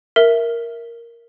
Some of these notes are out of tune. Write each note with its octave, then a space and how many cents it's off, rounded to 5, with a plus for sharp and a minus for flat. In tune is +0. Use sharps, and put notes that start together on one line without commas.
A#4 +0 E5 +0